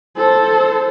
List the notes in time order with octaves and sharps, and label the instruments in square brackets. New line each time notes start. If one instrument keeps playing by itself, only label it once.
[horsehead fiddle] A4 C5